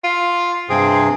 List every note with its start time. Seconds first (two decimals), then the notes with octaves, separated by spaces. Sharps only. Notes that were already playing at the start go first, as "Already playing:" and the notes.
0.04 F4
0.70 G2 C3 C4 G#4